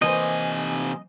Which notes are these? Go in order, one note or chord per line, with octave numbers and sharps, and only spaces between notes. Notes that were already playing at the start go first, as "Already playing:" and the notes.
C3 E3 A#3 C5 D#5 G#5